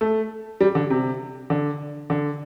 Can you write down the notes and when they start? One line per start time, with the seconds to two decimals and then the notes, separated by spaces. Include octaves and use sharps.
0.01 A3
0.61 G3
0.75 D3
0.90 C3
1.50 D3
2.10 D3